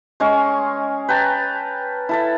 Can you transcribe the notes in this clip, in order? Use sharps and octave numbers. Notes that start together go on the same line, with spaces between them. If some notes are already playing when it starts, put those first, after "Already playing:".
G#3 C#4 G#5 C#6
B4 G5 A5 A#5
E4 A4 E5